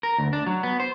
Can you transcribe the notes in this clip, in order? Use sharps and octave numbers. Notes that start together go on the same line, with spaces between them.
A#4
D2
D4
F#3
B3
C5